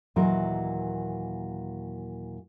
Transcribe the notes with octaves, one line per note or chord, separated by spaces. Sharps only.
D#2 A#2 E3 F#3 A#4 D#5